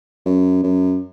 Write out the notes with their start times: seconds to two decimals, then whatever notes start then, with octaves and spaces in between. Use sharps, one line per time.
0.26 F#2
0.64 F#2